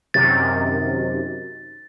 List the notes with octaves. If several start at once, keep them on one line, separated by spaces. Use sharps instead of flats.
F#2 C3 D#3 A6